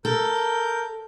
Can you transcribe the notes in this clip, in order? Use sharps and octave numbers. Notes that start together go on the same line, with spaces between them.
A4 A#4 G6